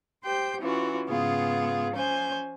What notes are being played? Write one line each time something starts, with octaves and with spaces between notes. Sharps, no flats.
G4 C5 G5 G6
E3 C#4 F4 F#4
G#2 C#3 B3 F4 G#4
F3 C#4 C5 G#5 G6